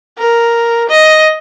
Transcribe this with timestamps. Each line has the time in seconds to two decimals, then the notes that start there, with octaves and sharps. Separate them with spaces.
0.18 A#4
0.89 D#5